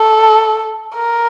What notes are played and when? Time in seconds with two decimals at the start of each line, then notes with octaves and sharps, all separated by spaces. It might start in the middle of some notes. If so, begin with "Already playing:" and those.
Already playing: A4
0.96 A#4